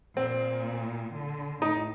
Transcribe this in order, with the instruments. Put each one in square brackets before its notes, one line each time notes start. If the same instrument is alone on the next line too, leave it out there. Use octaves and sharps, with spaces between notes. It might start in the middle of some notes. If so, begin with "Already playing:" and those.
[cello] A#2 [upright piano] C4
[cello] D3
[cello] A2 [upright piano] D#4